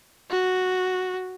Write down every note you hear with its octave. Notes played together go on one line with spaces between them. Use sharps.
F#4